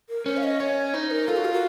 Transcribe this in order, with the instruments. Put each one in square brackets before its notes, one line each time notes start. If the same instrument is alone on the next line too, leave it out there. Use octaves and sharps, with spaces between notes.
[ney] A#4
[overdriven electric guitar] C#4 [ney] C5
[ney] F5
D#5
[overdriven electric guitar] C#4 [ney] C#5
[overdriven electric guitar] D#4 [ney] C5
[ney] A#4
[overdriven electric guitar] F4 [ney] A4
[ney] F#4
A#4
F#4